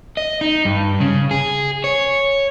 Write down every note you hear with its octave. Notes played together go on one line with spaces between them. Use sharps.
D#5
D#4
G2
C#3
G#4
C#5